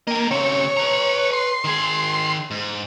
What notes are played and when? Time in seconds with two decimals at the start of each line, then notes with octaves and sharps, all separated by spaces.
0.07 A#3 D#5 G5
0.31 C#3 C4 C#5
0.77 B4 A#5
1.33 C6
1.64 D#3 G#4
2.51 G#2